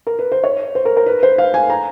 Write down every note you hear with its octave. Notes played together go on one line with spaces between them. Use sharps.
A#4
B4
C5
C#5
C5
A#4
A#4
B4
C5
F5
G#5
A#5